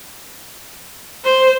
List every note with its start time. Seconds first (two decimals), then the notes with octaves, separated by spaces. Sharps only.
1.25 C5